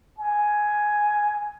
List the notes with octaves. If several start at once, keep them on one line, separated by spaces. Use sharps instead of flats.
G#5